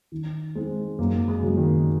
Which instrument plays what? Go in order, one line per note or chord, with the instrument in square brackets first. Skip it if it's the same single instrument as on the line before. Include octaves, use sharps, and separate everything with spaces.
[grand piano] D#3
G#3 C4 D#4
[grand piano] F#2 [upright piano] A#3
[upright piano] G#3
[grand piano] C#3 F#3 A#3
[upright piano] D#3